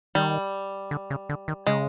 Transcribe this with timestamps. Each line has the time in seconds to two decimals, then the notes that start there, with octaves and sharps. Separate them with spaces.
0.15 D#3 G3
0.91 D3
1.10 C#3
1.29 D3
1.48 D#3
1.67 C#3 G#3